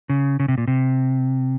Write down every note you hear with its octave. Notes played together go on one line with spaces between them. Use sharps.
C#3
C#3
C3
A#2
C3